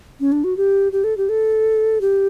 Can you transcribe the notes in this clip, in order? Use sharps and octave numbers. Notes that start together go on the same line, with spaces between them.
C#4
D4
F#4
G4
G4
A4
G4
A4
G4